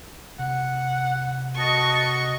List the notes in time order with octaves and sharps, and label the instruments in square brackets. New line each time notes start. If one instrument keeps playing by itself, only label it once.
[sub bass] C3 [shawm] F#5
[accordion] F#4 D#5 [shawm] A5 [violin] C#6